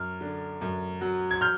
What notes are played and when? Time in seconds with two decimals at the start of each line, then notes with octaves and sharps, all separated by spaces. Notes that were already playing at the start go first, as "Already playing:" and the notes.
Already playing: F#2 F6
0.21 D3
0.61 F#2
1.01 F#3
1.31 G#6
1.41 F6 G6